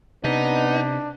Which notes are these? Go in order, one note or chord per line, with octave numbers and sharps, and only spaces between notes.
C3 B3 D4 D#4